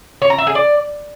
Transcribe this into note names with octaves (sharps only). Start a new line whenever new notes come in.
C#5
A#5
E5
G#4
D5